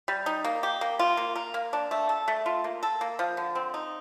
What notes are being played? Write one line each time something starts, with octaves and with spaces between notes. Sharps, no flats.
G3
D#4
A#3
G4
A#3
F4
A#3
A#4
A#3
D4
A3
A4
A3
F4
A#3
A4
A#3
F3
D3
C4
D#4